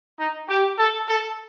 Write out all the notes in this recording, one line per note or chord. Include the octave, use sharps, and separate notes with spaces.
D#4
G4
A4
A4